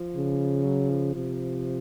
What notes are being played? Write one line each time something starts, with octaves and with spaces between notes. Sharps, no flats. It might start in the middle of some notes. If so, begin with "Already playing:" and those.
Already playing: F3
C#3
F#3
F3
C3 F3